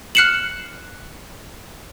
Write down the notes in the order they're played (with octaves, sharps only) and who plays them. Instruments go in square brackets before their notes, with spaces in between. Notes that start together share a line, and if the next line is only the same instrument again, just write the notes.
[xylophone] F6 F#6 C7 C#7 E7 F#7